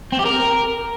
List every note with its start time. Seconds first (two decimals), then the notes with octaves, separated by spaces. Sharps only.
0.12 C4
0.19 G4
0.26 A#4